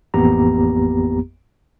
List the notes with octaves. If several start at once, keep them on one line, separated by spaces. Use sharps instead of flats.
A1 F2 A#3 B3 G4 A#5